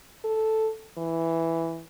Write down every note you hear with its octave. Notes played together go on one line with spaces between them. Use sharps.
A4
E3